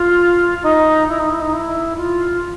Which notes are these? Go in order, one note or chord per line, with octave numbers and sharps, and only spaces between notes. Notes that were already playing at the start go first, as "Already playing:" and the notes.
Already playing: F4
D#4
E4
D#4
E4
D#4
E4
F4